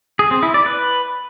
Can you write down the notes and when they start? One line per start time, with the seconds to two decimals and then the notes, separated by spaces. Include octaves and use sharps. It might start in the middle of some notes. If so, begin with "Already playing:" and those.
0.19 G#4
0.31 C4
0.43 E4
0.54 D5
0.66 B4